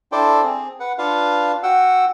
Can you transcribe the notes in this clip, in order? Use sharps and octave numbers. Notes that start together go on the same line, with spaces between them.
D4 E4 A4 C5 D5 G5
C4 G#4
B4 F#5
D4 F4 B4 F5
F#4 F#5 G5 E6